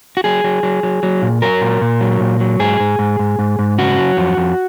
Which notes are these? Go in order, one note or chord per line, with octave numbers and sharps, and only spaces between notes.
F#4
F#3 G#4
F#3
F#3
F#3
F#3
A#2
F#3 A#4
A#2
A#2
F#3
A#2
F#3
G#2 G#4
G#2
G#2
G#2
G#2
G#2
C#3 F#4
F#3
F2
F2